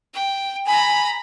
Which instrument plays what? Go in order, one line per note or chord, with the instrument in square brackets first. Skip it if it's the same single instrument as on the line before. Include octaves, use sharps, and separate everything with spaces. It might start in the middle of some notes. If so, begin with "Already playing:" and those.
[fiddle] G5
[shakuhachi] G#5 [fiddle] A#5 B5